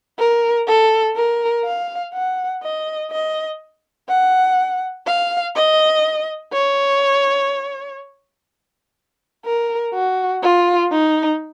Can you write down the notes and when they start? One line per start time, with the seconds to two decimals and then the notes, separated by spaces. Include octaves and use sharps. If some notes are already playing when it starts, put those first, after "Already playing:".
0.19 A#4
0.67 A4
1.16 A#4
1.65 F5
2.13 F#5
2.63 D#5
3.11 D#5
4.09 F#5
5.06 F5
5.55 D#5
6.53 C#5
9.45 A#4
9.94 F#4
10.43 F4
10.92 D#4